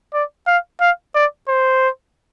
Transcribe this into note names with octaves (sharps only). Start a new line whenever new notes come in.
D5
F5
F5
D5
C5